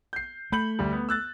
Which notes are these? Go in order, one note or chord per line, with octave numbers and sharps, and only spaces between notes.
G6 C7
A3 B5 G6 F#7
D2 G3
B3
E6 F#6 A6